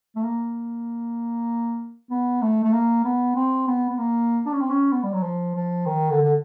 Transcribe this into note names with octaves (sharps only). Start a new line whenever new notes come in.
A3
A#3
B3
A3
A3
A#3
B3
C4
B3
B3
A#3
D4
C#4
C4
C#4
B3
G3
F#3
F3
F3
D#3
D3
D3